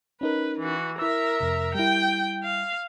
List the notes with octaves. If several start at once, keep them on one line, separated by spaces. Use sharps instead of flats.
C#4 D#4 A#4 B4
E3 F#4
E4 A#4 E5 E6
F2 C3
G3 E4 G5
F5